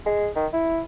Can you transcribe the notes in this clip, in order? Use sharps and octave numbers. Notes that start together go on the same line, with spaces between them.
G#3
D#3
E4